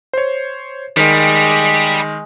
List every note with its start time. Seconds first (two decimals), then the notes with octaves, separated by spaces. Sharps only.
0.13 C5 C#5
0.97 D#3 G3 G#3